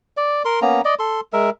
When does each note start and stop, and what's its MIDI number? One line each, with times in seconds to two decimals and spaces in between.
0.17 0.42 74
0.45 0.60 70
0.45 0.60 84
0.62 0.81 58
0.62 0.81 59
0.62 0.81 61
0.62 0.81 82
0.85 0.94 74
0.85 0.94 75
0.99 1.20 69
0.99 1.20 84
1.33 1.50 56
1.33 1.50 70
1.33 1.50 76